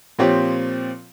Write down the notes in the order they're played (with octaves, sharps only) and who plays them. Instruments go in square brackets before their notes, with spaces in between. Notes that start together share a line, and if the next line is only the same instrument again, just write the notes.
[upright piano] A#2 F3 C4 G4 C#5